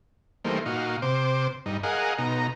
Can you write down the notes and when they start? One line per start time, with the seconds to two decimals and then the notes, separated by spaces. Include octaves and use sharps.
0.45 E3 G3 A3 A#3 D#4 C5
0.66 A#2 D#4 F#4 F5
1.02 C3 C5 D6
1.66 G2 D#4
1.83 G#4 A#4 D#5 F5 F#5
2.18 B2 D#4 A#5